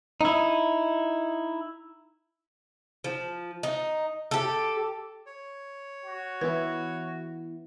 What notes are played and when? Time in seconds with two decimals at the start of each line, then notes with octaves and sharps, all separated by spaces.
0.21 D#4 E4
3.04 F3
3.63 D#4
4.31 G4 A4
5.26 C#5
6.05 F#4
6.41 E3 B3 E4 B4